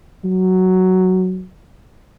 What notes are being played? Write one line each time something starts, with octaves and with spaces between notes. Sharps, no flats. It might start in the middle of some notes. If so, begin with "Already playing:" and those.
F#3